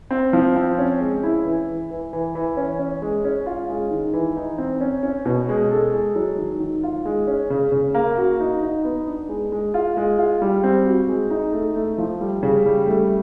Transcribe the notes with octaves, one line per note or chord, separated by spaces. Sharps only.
C4
F3
C4
C#4
G#3
E4
E3
E3
E3
E3
E3
C#4
C#4
G#3
C#4
F4
G#3
D#3
E3
D#4
C4
C#4
C#4
B2
G#3
A4
G#3
F#3
D#3
D#3
F4
G#3
C#4
C#3
C#3
A#3
F#4
D#4
D#4
B3
D4
G#3
G#3
F4
G#3
F4
G3
C4
F#4
G#3
D#4
A3
A3
F3
G3
C#3
G3
A3